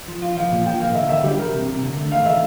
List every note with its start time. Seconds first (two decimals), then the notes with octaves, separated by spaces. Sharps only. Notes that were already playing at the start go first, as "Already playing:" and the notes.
0.08 F3
0.22 F4
0.37 F3 F5
0.51 A#2
0.66 F3 G5
0.80 A#3 F5
0.95 D3 E5
1.09 D3 E5
1.24 G3 G4
1.39 G3 A#4
1.54 C3
1.67 C3
1.82 D3
1.97 A3
2.11 A3 F5
2.26 A3 E5